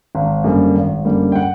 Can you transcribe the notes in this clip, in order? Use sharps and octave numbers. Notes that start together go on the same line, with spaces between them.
G#1
F#2 D3 G3 A#3
G#1
F#2 D3 G3 A#3
G5
F#5